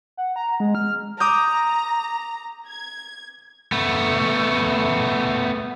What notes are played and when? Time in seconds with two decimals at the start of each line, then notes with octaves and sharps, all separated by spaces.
0.17 F#5
0.36 A#5
0.60 G#3
0.75 F6
1.20 A#5 D6 D#6 G6
2.68 G#6
3.72 A3 B3